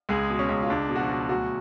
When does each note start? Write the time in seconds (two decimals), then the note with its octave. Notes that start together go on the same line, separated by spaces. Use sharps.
0.09 C#2 G#3 G#4
0.30 B2
0.39 C#4
0.49 C#2
0.62 F4
0.70 C#2 D4
0.89 B2
0.95 F#4
0.99 F3 F4
1.10 B2
1.29 D2 F#3 F#4